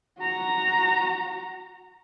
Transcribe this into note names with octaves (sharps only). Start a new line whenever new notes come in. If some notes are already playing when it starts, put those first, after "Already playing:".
F#4 A#5